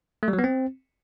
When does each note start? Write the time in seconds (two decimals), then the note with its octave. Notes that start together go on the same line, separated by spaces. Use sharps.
0.23 A3
0.28 G3
0.33 F#3
0.39 B3
0.44 C4